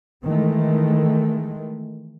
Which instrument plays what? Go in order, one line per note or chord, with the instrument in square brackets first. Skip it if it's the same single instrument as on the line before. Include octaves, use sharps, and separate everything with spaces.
[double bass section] D#3 E3 G#3 A3